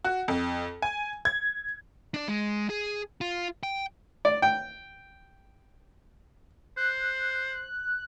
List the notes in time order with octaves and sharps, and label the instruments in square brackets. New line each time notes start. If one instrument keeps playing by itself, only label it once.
[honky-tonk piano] F#4
F2
G#5
G#6
[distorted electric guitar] D4 D5
G#3
G#4
F4
G5
[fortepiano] D5
G5
[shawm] C5 [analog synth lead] F#6